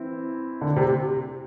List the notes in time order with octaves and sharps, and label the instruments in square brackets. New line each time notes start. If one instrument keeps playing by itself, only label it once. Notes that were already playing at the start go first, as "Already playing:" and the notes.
Already playing: [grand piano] E3 C4 E4
[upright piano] D3
C3